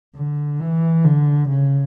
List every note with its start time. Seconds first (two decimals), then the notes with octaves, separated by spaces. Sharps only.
0.15 D3
0.60 E3
1.04 D3
1.49 C#3